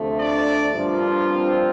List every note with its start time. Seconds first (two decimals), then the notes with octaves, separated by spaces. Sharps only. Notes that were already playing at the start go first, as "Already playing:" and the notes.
Already playing: D2 C3 F3 A3
0.17 D4 D5
0.73 G2 F3 A#3 D4 F4
1.27 C4 C5